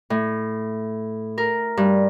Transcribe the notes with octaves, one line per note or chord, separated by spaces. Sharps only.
A2
A#4
G2